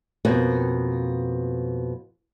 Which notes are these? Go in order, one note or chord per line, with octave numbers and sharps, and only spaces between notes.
F2 B2 A#3